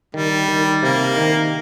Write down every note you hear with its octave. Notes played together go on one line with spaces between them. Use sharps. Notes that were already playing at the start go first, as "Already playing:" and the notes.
D#3 G3
D#3
C3 A#3
D#3